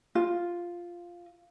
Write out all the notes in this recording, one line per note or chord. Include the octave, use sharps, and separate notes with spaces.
F4